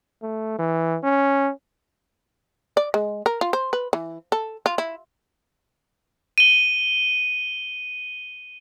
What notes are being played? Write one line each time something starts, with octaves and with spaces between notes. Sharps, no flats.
A3
E3
C#4
D5
G#3
A#4
F4
C5
B4
E3
A4
F4
E4
D#7 G7